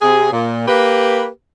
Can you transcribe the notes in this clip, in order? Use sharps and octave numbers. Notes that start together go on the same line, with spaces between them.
C3 G#4
A#2
A#3 G4 B4